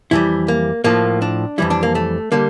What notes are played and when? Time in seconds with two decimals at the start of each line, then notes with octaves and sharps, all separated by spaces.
0.11 F2 E3 G3 E4
0.48 A#3
0.84 A2 F3 A#3
1.22 D4
1.58 F2 E3 G3 E4
1.70 D4
1.83 A#3
1.95 A3
2.32 D3 G3 A#3